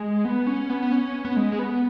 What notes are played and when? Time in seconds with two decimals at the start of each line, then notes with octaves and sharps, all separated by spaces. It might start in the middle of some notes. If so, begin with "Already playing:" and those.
Already playing: G#3
0.25 B3
0.47 C#4
0.70 B3
0.83 B3
0.92 C#4
1.25 B3
1.36 G#3
1.52 G#3
1.59 B3